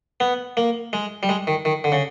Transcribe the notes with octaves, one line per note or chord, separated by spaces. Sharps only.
B3
A#3
G#3
G3
G#3
D#3
D#3
D3
C#3